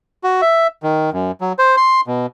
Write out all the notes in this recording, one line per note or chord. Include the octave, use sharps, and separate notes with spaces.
F#4
E5
D#3
F#2
F#3
C5
C6
B2